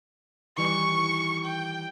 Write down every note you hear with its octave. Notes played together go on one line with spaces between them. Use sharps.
D#3 E3 G3 C#6
G5